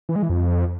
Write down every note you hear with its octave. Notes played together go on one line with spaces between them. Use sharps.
E3
G#3
E3
F2